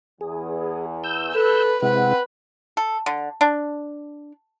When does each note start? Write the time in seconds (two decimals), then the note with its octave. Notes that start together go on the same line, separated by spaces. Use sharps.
0.21 E2 G#4
1.04 E6 G6
1.35 A4 B4
1.83 C3 G#3 C4 E4 B4 F#5
2.77 A4
3.06 D3
3.41 D4